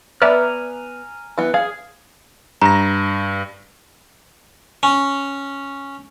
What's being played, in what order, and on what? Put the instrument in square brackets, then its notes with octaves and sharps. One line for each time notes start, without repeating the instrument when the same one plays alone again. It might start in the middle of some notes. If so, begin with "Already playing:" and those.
[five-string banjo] B3 [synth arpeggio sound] B4 D5 E5 [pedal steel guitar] G#5 A#5 F6
[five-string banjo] E3 B3
[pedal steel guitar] G#4 [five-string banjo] F5
[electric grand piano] G2 A#6 [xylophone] A#5
[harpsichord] C#4